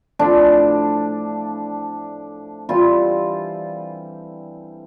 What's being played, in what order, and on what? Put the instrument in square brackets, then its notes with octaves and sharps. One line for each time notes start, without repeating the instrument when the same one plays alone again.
[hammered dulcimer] A2 F3 C4 D4
E3 G3 C4 F4